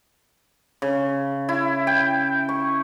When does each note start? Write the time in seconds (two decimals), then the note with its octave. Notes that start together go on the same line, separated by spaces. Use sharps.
0.82 C#3
1.49 E4
1.87 G5
2.49 C#6